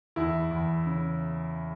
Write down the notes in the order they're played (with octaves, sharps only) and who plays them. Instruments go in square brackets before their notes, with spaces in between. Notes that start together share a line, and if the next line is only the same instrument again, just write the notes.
[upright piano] E2 E4
E2
C#3